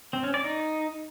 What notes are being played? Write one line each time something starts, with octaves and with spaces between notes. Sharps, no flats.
C4
C#4
D5
D#4